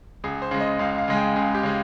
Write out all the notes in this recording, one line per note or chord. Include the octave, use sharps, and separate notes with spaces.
C#2 G#4
C5
C#3 G#3
D#5
C#2 F5
F5
C#3 G#3 G#5
G5
C#2 G#4
G4
C#3 G#3